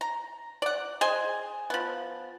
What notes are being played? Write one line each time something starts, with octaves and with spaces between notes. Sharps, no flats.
A#5
D5 F#5
G#4 C5 D#5 G#5
F3 B3